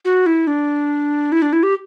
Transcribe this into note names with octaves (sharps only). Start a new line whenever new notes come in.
F#4
E4
D4
E4
D4
E4
G4